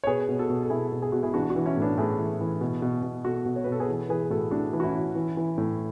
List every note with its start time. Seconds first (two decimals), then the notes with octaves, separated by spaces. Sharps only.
0.04 C#5
0.07 B2 G#4 B4
0.29 B2
0.39 F#4 A4
0.50 B2
0.63 A4
0.70 B2 E4 G#4
0.92 B2
1.02 G#4
1.12 B2 F#4
1.23 E4 G#4
1.34 E3 D4 F#4
1.50 D4 F#4
1.56 E3
1.66 C#4 E4
1.77 A2 B3 D4
1.98 A2 E4 G#4
2.19 E3
2.41 E3
2.61 B2
2.82 B2
3.03 B2
3.25 B2 F#4 A4
3.46 B2
3.56 C#5
3.64 B2 B4
3.72 A4
3.80 G#4 B4
3.88 E3
4.09 E3 G#4 B4
4.30 A2 F#4 A4
4.51 A2 D4 F#4
4.73 E3
4.80 F#4
4.83 C#4 E4
4.95 E3
5.15 E3
5.37 E3
5.58 A2